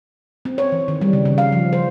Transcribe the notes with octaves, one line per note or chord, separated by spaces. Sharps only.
C4
C#5
E3
D#3
G3
C#3
C#3
F5
F3
C5